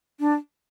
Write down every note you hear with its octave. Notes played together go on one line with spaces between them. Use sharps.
D4